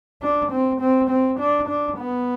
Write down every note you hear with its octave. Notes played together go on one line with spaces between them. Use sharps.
D4
C4
C4
C4
D4
D4
B3